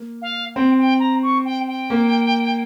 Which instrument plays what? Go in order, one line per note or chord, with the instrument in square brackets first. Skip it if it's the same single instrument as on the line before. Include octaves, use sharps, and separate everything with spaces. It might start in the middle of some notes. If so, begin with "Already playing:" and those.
Already playing: [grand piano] A#3
[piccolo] F5
[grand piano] C4 [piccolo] G5
[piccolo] G5
A#5
C#6
G5
G5
[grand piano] A#3